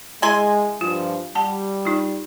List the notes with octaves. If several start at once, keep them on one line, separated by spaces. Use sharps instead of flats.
G#3 E4 G#5 C6
G2 F3 F4
G3 F#5 A5
D#4 F4